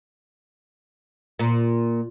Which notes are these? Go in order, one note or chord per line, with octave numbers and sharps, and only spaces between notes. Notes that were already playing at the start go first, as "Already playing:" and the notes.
A#2